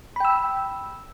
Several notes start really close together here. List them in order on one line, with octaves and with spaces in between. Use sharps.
B5 G5 E6